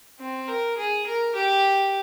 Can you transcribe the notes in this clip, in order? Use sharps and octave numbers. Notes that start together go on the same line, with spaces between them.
C4
A#4
G#4
A#4
G4